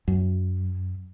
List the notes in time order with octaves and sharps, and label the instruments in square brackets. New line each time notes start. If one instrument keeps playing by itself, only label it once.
[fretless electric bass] F#2